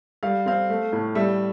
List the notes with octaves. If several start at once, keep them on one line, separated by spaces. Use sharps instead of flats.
G3 F5
C4 F5
A3
A2
G3 E5